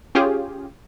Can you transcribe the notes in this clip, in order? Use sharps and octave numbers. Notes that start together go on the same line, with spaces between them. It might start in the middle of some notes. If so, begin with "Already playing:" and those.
C#4 F4 G4 G#4